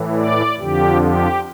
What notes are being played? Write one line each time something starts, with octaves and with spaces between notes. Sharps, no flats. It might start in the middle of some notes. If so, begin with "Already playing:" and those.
Already playing: A2 E3
D5
F2 D3 F3 G4
G4